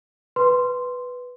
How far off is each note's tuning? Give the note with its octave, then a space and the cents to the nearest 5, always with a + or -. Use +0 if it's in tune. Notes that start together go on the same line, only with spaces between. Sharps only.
B4 +0 C6 +0